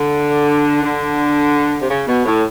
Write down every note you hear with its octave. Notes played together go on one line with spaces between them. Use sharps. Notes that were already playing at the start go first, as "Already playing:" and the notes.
Already playing: D3
D3
C3
C#3
B2
A2